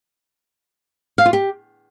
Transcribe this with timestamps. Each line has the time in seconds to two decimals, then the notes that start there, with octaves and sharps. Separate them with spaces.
1.18 F5
1.26 F4
1.33 G4